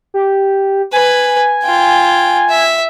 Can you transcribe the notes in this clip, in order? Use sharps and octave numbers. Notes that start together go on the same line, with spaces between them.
G4
B4 G#5
F4 G5
E5